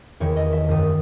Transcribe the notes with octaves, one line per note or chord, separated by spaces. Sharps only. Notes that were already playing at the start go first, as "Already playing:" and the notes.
E2 D#3 C#5
D#5
E5
F#2 D#3 D#6